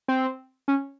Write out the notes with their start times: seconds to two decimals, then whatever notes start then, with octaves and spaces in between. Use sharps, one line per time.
0.08 C4
0.68 C#4